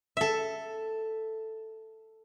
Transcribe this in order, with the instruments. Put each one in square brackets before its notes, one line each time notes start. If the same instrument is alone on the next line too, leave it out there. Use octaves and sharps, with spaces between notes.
[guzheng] A4 E5